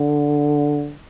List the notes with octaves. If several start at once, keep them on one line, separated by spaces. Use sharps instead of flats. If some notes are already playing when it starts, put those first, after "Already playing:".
Already playing: D3